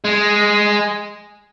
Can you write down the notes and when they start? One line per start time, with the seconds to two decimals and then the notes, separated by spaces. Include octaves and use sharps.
0.05 G#3